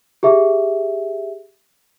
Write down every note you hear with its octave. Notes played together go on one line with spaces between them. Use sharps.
G4 G#4 E5